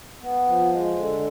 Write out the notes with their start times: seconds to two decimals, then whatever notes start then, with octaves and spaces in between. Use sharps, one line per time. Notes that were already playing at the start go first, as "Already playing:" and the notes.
0.22 B3
0.47 F3
0.72 G#3
0.96 D3